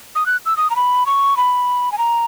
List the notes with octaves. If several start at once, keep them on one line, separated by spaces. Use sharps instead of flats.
D#6
F#6
E6
D#6
A#5
B5
C#6
B5
G#5
A#5